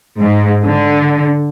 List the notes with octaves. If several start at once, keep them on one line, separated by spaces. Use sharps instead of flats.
G#2
D3